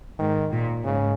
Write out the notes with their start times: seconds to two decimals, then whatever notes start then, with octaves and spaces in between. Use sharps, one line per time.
0.19 G#2 D#3
0.52 A#2
0.84 G#2 C#3